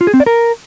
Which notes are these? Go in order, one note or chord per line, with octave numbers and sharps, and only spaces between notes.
F4
G#4
C4
D5
A#4